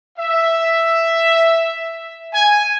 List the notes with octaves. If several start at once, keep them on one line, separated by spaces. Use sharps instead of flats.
E5
G#5